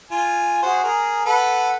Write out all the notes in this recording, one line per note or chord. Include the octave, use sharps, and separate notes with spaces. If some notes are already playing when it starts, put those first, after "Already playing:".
F4 G#5
F#4 G#4 C5
G#4 A#4
A4 B4 F#5